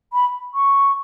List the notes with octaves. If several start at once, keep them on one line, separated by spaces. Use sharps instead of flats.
B5
C#6